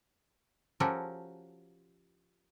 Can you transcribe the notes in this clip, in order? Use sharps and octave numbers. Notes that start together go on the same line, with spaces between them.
F3 C#4 F#4 G4 A4 A#4